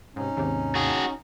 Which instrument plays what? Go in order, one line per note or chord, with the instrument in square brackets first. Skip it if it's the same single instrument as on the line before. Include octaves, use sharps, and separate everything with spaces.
[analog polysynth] G#2 C3 [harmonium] C#4 D#4
[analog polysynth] D#2 G#2 C3
[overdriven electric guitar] F#4 G#4